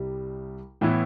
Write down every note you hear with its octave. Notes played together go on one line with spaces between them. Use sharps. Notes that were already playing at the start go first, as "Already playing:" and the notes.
Already playing: C2 C3 G3
A2 E3 B3 E4